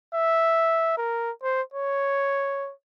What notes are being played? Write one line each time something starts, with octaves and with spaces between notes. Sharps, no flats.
E5
A#4
C5
C#5